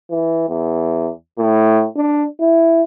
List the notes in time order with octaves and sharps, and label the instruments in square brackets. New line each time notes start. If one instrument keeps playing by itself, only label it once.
[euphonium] E3
E2
A2
D4
E4